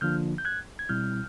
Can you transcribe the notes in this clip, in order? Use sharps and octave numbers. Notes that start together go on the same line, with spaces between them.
D3 F3 A#3 D4 F4 F6 G6
G6
F#6 G#6
G#6
B2 G3 C4 E4 F6 G6